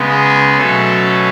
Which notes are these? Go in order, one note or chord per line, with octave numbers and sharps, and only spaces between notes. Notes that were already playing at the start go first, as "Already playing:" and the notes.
Already playing: C#3 G#3 B3
G#4
B2 F#3 A3 C#4 A4